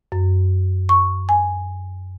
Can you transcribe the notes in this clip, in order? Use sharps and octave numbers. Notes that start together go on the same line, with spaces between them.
F#2
C#6
G#5